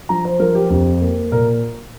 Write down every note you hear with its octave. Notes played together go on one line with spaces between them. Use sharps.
F3 A#5
C5
F3 A#4
G4
F2 G4
A#3
A#2 A#4